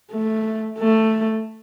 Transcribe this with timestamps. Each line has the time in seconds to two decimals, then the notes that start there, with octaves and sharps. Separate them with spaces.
0.12 A3
0.79 A3